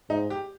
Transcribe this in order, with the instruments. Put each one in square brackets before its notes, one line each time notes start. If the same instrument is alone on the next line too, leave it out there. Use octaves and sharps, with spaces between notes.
[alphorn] G#2 [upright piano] D#4
[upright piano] G4